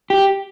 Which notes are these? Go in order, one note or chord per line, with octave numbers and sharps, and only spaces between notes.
G4